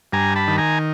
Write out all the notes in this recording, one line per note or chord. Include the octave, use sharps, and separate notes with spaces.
G2 G#5 A#5
A5 B5
D#3
G#5 A#5